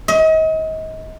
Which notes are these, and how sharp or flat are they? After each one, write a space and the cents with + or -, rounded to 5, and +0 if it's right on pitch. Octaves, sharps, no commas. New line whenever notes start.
D#5 +35